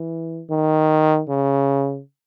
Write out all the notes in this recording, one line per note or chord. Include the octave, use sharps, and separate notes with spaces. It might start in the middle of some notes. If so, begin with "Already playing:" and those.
Already playing: E3
D#3
C#3